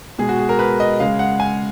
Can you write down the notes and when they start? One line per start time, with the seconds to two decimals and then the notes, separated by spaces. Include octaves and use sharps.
0.18 B2 G#3 G#4
0.29 F#4
0.39 G#4
0.49 A#4
0.59 B4
0.80 D#5
1.00 C#3 G#3 F5
1.19 F#5
1.40 G#5